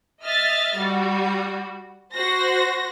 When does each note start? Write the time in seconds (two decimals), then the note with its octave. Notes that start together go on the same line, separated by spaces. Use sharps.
0.23 D#5 E5 F6 A6
0.77 G3 F#4
2.13 F#4 C5 A#6